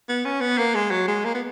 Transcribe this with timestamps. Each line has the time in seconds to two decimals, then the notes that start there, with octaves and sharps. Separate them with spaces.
0.09 B3
0.25 C#4
0.41 B3
0.58 A#3
0.75 G#3
0.91 F#3
1.08 G#3
1.25 A#3
1.35 B3